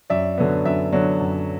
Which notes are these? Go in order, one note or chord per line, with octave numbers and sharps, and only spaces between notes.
F#2 D5 E5
D3 F#3 B3
F#2 D5 E5
D3 F#3 B3
F#2